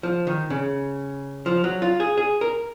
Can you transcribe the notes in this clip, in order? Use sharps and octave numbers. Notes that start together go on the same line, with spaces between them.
F3
D#3
C#3
F3
F#3
F4
G#4
G#4
A#4